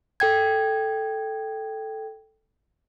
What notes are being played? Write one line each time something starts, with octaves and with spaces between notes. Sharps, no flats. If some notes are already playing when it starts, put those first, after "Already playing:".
A4 G5 G#6